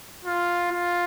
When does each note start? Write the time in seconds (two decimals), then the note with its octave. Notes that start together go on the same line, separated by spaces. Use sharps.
0.25 F4
0.71 F4